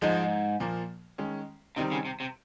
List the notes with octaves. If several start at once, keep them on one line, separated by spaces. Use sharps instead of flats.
G#2 F3 G#3 D#4
A#2 F3 A#3
D#3 G#3 C#4
C3 D#3 G3 C4 D#4
C#3
C3
C3